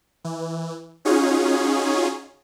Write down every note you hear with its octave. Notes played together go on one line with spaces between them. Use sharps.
E3
C#4 D#4 F4 F#4 G#4 C#5